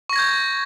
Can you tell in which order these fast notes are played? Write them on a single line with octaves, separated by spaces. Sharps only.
C#6 A#6 G#6 G6